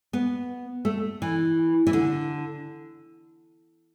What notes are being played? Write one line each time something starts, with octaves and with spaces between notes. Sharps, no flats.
B3
A3
E3
E3
D3